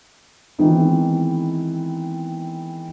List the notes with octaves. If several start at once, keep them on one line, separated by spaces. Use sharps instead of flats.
D#3 E3 G#3 B3 C4 D#4